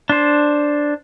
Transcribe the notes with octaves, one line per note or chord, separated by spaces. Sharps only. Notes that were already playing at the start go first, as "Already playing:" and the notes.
D4 C5